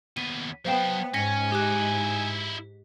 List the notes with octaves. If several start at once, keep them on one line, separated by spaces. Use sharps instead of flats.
D#2 B3 D#7
F#3 B3 C5 F5 G5 A5
G#2 C#4 G#5 A#6 B6 C#7
D#4 E4 G4 F#6